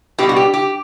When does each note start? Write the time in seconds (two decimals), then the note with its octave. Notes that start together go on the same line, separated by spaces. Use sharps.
0.18 B2 G3 G4
0.29 F#4
0.36 G4
0.54 G4